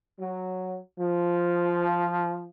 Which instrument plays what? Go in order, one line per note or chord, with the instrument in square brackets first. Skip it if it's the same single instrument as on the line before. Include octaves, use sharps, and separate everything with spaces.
[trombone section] F#3
F3